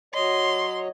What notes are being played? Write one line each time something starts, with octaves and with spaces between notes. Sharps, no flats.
F#3 C#5 D#5 C6